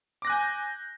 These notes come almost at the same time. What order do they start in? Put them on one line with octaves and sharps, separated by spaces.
D6 A#6 F#6 G#5 G6